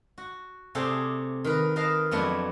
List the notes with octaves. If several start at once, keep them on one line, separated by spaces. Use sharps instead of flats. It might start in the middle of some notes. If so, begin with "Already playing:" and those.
F#4
C3 A3 G#4 A4 D5 G5
D#3 A#4 B4
A#4 B4 D#5 F5 A5
F2 F#3 A3 B3 D4 E4